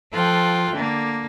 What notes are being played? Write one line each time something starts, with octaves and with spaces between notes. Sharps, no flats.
F3 F4 A4 G5 F#6
D3 A#3